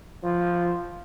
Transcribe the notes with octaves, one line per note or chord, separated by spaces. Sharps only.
F3